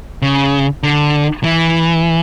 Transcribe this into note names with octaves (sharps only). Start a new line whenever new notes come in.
C#3
D3
E3